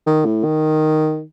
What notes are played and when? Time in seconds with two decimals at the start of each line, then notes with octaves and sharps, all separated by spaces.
0.06 D#3
0.25 A2
0.44 D#3